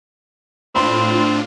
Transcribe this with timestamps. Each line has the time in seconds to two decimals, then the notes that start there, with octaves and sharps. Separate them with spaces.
0.75 A2 C4 D4 F4 B5 C6